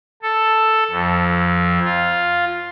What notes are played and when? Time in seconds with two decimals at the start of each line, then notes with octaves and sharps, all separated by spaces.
0.22 A4
0.91 F2
1.85 F4